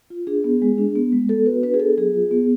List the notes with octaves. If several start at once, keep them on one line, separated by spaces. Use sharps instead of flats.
F4
D4 G#4
B3
G#3
D4
B3
G#3
B3 A4
F#4 B4
D4 B4
G#4
B3 A4
F#3 G#4
F4
B3